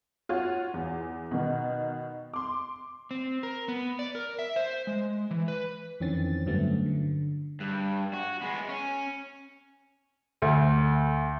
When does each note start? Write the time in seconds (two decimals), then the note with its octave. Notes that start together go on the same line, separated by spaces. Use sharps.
0.29 F4 F#4 C#5
0.74 E2
1.31 B2 D#3
2.34 C6 D6
3.11 C4
3.43 A#4
3.68 B3
3.99 D5
4.15 A#4
4.39 E5
4.56 C5
4.87 G#3
5.31 E3
5.48 B4
6.00 F2 D#3 E3 C4 C#4 A6
6.46 G2 D3 F#3 A3 B3 C#4
6.86 D3
7.60 G2
8.14 F#4
8.41 G#3 B3
8.69 C#4
10.42 D2